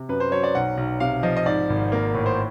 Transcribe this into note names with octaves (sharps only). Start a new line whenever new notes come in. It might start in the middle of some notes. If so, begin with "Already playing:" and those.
Already playing: C3
F#2 B4
C5
F#3 C#5
D5
B1 F#5
B1
C3 F5
F3 D#5
D#5
G#2 D5
G#1
A#3
A2
C5